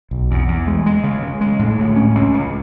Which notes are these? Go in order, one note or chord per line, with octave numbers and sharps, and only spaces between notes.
B1
E2
E2
G#3
G#3
C#3
C#3
G#3
A2
D2
C#4
C#2
C#2